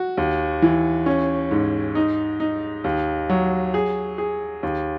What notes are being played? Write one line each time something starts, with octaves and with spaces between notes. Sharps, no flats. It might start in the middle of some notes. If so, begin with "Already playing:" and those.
Already playing: F#4
D#2
E3
C#4
G#2
D#4
D#4
D#2
F#3
G#4
G#4
D#2